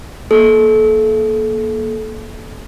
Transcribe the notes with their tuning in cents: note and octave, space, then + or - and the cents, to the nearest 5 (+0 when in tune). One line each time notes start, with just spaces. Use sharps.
A#3 +10 A4 -30